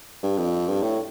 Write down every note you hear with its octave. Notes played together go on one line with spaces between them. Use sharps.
G2
F2
G2
A2